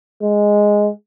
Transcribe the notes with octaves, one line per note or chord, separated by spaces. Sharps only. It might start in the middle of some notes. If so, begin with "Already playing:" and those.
G#3